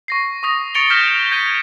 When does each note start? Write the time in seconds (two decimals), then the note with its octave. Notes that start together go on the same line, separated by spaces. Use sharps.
0.08 C#6 A#6 C7
0.43 C#6 D#6 A#6
0.74 C#6 A6 C#7 D7 F7 G7
0.90 F6 G6 A#6 B6 E7
1.31 G6 G#6 B6 D#7